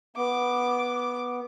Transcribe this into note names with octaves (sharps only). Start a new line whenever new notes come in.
B3 D6